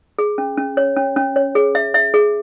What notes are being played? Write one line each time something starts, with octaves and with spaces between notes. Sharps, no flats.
G#4
C#4
C#4
C#5
C#4
C#4
C#5
G#4
E5
E5
G#4